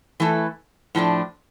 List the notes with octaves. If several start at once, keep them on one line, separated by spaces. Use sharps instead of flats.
E3 A3 E4 A4
A2 F3 A3 D4